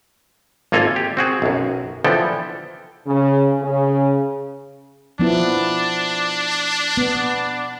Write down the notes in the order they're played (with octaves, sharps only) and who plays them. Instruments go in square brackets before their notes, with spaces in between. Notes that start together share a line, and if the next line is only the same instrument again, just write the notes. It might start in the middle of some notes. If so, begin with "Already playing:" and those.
[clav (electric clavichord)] G#1 A#3 F4 A4 G#5 A#5
G4
C4 F#4 G#4
B1 F#2
D3 E3 F3 B3 A4 G5
[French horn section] C#3
C#3
[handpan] F3 B3 E4 [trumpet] D4
[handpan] B3